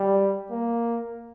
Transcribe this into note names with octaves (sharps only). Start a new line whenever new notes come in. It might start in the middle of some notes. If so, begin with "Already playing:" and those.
Already playing: G3
A#3